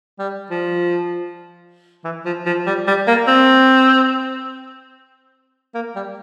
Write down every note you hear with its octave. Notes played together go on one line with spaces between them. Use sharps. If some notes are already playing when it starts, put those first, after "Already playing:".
G3
F3
E3
F3
F3
G3
G3
A#3
C4
A#3
G3